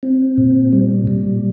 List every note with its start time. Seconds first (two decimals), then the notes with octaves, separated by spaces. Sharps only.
0.03 C4
0.38 A#2
0.73 G3
1.07 A#2